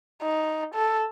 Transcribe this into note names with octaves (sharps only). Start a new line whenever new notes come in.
D#4
A4